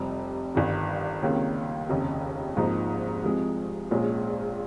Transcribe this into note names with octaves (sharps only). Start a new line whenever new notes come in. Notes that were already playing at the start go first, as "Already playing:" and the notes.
Already playing: F1 F2 C3 G3
G1 G2 D#3
C#2 C3 D#3 A#3 C#4
F1 D#2 C#3
G#1 G#2 F3 A#3 D#4
C2 C3 F3 G#3
A#1 A#2 G#3 C#4